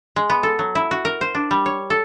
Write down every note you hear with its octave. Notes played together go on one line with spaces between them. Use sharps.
G#3
B3
A4
F#3
E4
F#4
A#4
C5
D4
G3
C#5
A4